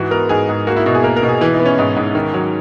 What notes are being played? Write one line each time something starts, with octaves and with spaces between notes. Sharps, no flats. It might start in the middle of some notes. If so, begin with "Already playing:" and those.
Already playing: G#2 E3 F#4
B3 A#4
G#2 G#4
G#2
A#3 F#4
E4
B2 F#4
G#4
A#3 A#4
A#4
B2
G#4
E3 E4
D#4
B3
C#4
G#2
G#2
D#3
F#3